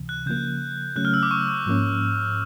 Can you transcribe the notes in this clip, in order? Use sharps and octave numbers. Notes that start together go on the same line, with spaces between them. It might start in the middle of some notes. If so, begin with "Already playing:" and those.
Already playing: C#2 C3 E3
F#6
C#3 F3 A#3 G6
C#3 F#3 A3 C#4 F#6
F6
E6
D6
C#6
C#6
G#2 F3 A#3 C#4